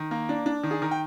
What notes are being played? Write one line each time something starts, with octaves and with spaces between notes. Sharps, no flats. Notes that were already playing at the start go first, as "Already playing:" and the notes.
Already playing: D#3
A#3
D4
D4
D#3
G#4
D#3 A#4
G5